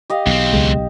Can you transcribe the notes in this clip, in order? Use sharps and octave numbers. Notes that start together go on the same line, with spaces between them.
G4 D#5 F5
B1 E2 C4
C#2 G#3